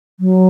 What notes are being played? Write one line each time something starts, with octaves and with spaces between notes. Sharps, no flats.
F#3